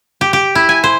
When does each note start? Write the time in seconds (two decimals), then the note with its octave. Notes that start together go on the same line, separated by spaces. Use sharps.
0.21 G4
0.33 G4
0.55 E4
0.69 G#5
0.84 C5